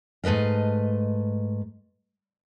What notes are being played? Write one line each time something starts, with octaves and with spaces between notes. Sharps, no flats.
G#2 A3 B4 D#5 F5